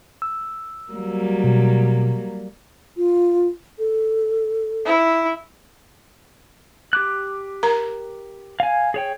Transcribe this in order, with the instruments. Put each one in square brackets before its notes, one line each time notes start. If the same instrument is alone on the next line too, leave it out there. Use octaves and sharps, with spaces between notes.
[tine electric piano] E6
[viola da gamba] F#3 G3 A#3
[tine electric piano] B2
[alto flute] F4
A4
[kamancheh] E4
[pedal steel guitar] G4 D6 F#6
[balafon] A#4 A#5
[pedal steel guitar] F5 G#5
G#4 C#5 G5